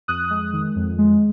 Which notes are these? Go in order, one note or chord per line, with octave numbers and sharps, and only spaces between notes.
F2 D#6 F#6
G#3
D#3
F2
G#3